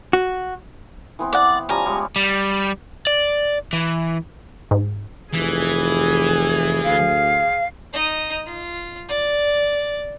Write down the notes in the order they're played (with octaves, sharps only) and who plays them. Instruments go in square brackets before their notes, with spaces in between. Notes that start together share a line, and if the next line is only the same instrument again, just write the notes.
[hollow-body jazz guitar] F#4
[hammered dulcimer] E3 B3 C4
[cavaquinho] D5 F#5
[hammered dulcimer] F3 G3 C#4 [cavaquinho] G#5 A#5
[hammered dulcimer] G3 G#3 C#5
[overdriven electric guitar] G3
D5
E3
[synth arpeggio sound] G#2
[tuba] F1 [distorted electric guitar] E3 [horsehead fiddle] G#4
[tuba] D2 [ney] F5
[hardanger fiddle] D#4 D#5
F4
D5